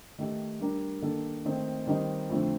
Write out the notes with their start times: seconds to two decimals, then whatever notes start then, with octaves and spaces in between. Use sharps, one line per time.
0.18 D#3 A3 D#4 G4
0.60 G3 D4 G4 A#4
1.02 D#3 A#3 D4 A4
1.45 D#3 A3 C4 D#4
1.87 D#3 G3 C4 D#4
2.29 F2 D3 A3 C4